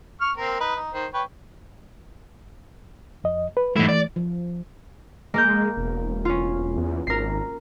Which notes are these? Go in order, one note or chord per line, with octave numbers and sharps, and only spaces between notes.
C#6 F6
A#3 C4 A#4
D#4 B4
D#4
D#3 C5
B4 C#5 G5
F2 D#5
B4
G#2 E3 A3 E4
D5
F3
G#3 A#3 A#4 G6
E1
C#4 F4
E2
G#1 A#4 C7